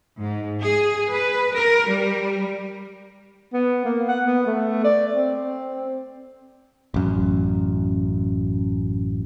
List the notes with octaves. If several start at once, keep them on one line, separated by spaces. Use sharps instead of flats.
G#2
G#4
B4
A#4
G3
B3
A#3
F#5
B3
A3
D5
C4
A1 F#2